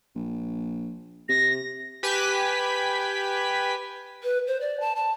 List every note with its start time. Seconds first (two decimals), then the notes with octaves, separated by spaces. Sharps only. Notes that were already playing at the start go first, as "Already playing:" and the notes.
0.15 A#1
1.29 C3 A#6
2.03 G4 B4 G#5 B6
4.24 B4
4.47 C5
4.61 D5
4.80 A5
4.96 A5